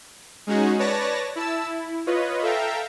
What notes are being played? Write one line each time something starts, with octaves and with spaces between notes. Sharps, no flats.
G#3 C#4 D#4 F#4 G#4
B4 C#5 D5 A5 A#6
E4 A5 E6
E4
F4 B4 C#5 D#5
A4 E5 F5 G5 A#5